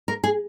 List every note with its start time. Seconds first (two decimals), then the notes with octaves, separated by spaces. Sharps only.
0.08 A#4
0.24 G#4